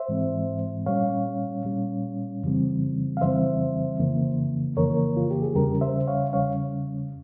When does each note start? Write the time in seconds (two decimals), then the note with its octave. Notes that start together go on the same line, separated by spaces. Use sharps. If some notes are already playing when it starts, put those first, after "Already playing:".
Already playing: C5 E5
0.09 G#2 E3 G#3 C4
0.86 A#2 G3 C#4 C#5 F5
1.65 A#2 G3 C#4
2.43 F2 C#3 E3 G3 C4
3.17 F5
3.21 F2 C#3 E3 G3 C4 C5 E5
3.99 F2 C#3 E3 A#3
4.77 F2 C#3 E3 A#3 A#4 C#5
5.17 F4
5.31 G4
5.42 G#4
5.55 E2 C#3 G3 C#4 G4 A#4
5.81 C5 E5
6.07 C#5 F5
6.33 E2 C#3 G3 C#4 C#5 F5